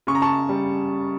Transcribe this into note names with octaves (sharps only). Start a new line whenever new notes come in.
C#3 C#6
A#5
A5 C#6
G3